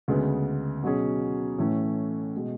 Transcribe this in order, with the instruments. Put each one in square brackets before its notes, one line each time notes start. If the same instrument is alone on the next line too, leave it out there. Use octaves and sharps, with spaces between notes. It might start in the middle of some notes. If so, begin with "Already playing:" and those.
[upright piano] D2 C#3 G#3 B3
B2 F#3 C#4 G#4
A2 E3 A3 C#4
B2 G#3